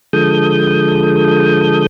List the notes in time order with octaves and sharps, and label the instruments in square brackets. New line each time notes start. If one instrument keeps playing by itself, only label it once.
[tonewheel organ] D3 F3 G#3 A4 D#6 G6